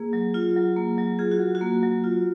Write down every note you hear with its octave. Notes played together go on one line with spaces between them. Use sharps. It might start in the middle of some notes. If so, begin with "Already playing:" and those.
Already playing: A#3 G#4
F#3
F4
F#3
A#3
F#3
F4 G#4
F#4
F#3
F#4
A#3
F#3
F4